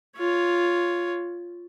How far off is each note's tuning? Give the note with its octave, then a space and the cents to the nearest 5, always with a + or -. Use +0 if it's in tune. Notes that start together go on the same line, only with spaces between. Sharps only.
F4 +0 C#5 +10